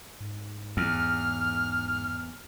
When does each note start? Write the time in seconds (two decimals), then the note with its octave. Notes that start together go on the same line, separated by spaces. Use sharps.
0.20 G#2
0.77 E2 F6